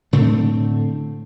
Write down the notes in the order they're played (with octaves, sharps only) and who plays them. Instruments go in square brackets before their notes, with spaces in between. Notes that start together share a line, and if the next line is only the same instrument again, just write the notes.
[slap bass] A2 D3 A3 C4